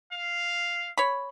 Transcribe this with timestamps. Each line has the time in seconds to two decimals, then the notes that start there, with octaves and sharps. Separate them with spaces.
0.12 F5
0.98 C#5 B5